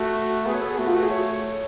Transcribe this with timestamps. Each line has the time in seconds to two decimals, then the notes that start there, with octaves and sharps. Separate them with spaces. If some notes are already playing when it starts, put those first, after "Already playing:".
Already playing: A3 F#4
0.46 B3 G#4
0.54 C#5
0.62 A4
0.70 G#4
0.78 A3 F#4
0.87 F4
0.95 F#4
1.03 G#4
1.11 C#5